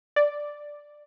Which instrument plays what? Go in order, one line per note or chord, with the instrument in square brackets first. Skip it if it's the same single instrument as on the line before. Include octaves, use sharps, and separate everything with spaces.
[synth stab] D5